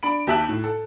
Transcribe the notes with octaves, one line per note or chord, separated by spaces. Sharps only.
D4 B5 D7
D#2 G4 E5 A5 F#6
A2
A4